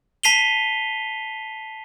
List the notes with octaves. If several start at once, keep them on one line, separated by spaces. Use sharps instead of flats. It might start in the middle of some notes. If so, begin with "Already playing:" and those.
A5 B6 C7 D#7 F7 G7